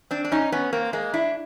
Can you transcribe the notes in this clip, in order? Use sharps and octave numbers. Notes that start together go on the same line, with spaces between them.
C4 D4
D4
C#4 D#4
B3 C#4
A#3 C4
G#3 A#3
D4 E4